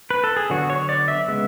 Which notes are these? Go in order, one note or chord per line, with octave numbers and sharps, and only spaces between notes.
B4
A4
G#4
D3 F#3 B3 F#4
C#5
D5
E5
C#3 G#3 B3